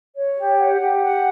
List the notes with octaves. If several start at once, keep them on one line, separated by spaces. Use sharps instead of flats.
C#5
G4
F#5
G4
F#5